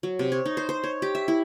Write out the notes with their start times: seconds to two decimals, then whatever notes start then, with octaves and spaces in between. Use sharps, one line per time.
0.03 F#3
0.19 C3
0.32 C#5
0.46 D#4
0.57 C5
0.69 C5
0.84 C#5
1.02 G4
1.15 E5
1.28 E4